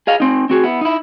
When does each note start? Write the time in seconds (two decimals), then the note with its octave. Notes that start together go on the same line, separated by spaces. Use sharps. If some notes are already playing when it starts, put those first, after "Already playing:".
0.07 G#4 D#5 F5
0.20 C4 D#4
0.50 C4 F#4 G#4
0.64 B3 E4
0.81 D#4 E4